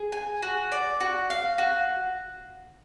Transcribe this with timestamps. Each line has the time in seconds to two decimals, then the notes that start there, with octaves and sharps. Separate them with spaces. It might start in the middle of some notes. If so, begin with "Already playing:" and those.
Already playing: G#4
0.12 G#5
0.42 F#4
0.72 D5
1.00 F#4
1.30 F5
1.58 F#4